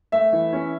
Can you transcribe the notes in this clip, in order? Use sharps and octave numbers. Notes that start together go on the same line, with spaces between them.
A3 E5
E3
C#4